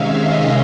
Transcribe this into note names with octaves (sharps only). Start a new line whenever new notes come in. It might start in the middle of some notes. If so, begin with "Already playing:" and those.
Already playing: C3 D#3 G#3 C#4 E5 F5
D#5